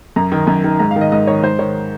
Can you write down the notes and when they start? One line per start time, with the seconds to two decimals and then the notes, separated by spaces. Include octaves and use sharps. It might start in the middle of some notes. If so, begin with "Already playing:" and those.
0.16 F#2 A#5
0.32 D#3
0.47 F#2
0.64 D#3
0.79 G#2 A#5
0.91 F5
0.96 D#3
1.01 D#5
1.12 G#2 D#5
1.27 D#3 C#5
1.43 G#2 C5
1.59 D#3 C#5